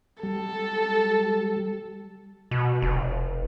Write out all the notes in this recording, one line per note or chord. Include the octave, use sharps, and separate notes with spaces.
G3 A4
B2
F1